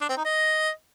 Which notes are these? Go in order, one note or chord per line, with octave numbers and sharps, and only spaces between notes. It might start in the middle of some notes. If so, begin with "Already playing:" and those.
D4
C4
D#4
D#5